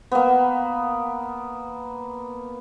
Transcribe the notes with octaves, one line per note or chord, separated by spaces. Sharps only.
A#3 B3